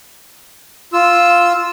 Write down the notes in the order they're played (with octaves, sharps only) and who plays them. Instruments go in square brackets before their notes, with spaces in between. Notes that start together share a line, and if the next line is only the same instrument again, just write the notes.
[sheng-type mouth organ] F4 E6